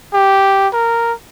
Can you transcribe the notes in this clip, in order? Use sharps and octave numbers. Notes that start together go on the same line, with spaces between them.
G4
A#4